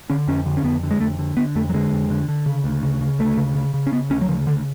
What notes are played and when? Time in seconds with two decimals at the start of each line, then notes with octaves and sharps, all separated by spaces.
0.10 D3 C#4
0.28 F2 C#4
0.46 D3
0.57 C#4
0.64 F2 B3
0.83 D3
0.91 G#3
1.00 F2 A3
1.19 D3
1.37 D3 B3
1.55 F2 A3
1.69 F#3
1.74 D3 G#3
1.92 F2
2.10 D3
2.28 D3
2.46 C#3
2.64 D2
2.83 C#3
3.01 C#3
3.19 D2 A3
3.37 C#3
3.55 C#3
3.74 C#3
3.87 C#4
3.92 C#3 B3
4.10 D2 C#4
4.21 F#3
4.28 C#3 F3
4.47 D2 D3